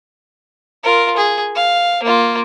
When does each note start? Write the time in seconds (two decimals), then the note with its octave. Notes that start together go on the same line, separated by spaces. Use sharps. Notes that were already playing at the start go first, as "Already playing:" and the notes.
0.84 F4 A#4
1.17 G#4
1.56 F5
2.03 A#3 F4